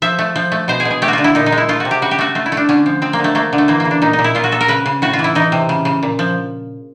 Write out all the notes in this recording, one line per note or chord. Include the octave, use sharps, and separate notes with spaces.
F3 E5
A3
F3
A3
B2 C5
G#4
B2
G#4
A3 G4
F#4
D3 F4
E4
A#2 D#4
D#4
G#3
E4
A3 F4
F#4
C3
G4
C#3 F#4
G4
A3 F#4
A3 F4
E4
A3
D4
D3 C#4
F3
F3 C4
A#3
D3
A3
A3 A#3
D3
A3
E3 A#3
A#3
C#3
D4
A#2 D#4
D#4
A#2
E4
A#2 F4
F#4
A#2 A4
A#4
C#3 B4
C#3
A2 F#4
F4
E3
E4
E3 D#4
C3
C#3
C#3
A#2
F3